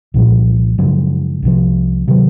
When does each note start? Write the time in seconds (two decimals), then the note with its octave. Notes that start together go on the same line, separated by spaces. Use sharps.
0.14 C2 A#2 F3 G#3
0.78 F#2 C#3 F3 G#3
1.43 C2 C3 F3
2.08 C3 D#3 F#3